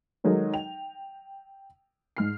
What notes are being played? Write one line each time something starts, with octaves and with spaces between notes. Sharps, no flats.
D#3 F#3 G#3 D#4 A4 A#4
G5 F7
G#2 F6 C7